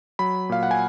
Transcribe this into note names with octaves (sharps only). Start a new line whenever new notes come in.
F#3 B5
A#2 F5
F#5
G#5